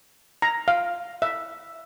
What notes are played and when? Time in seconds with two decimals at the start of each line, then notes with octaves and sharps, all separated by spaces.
0.42 A#5
0.68 F5
1.22 E5